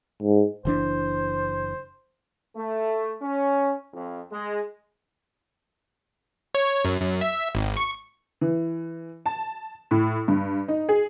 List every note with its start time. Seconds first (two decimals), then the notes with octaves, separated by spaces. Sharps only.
0.23 G#2
0.65 F#1 E3 D4 C5
2.56 A3
3.21 C#4
3.93 F2
4.31 G#3
6.55 C#5
6.85 F#2
7.01 F#2
7.21 E5
7.55 G#1
7.77 C#6
8.41 E3
9.26 A5
9.91 A2
10.28 G2
10.68 D#4
10.89 G#4